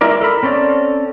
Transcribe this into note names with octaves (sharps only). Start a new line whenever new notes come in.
G#3 E4 F4 A#4 D5
A4 A#4 B5
C4 C#4 A4 D5